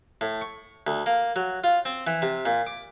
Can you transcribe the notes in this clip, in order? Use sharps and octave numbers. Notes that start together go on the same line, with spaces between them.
A2
C#6
D2
A#3
F#3
F4
C4
E3
C3
A#2
D6